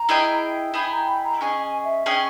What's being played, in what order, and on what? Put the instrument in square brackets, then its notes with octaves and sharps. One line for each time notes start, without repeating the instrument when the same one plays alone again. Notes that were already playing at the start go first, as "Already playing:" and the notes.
Already playing: [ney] A#5
[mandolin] E4 G#4 D#5 G5
[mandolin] E4 G#4 D#5 G5 [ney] B5
[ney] A#5
B5
A#5
[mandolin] C#4 G#4 D#5 [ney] G#5
[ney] G#5
E5
[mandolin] C#4 G#4 D#5 [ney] G5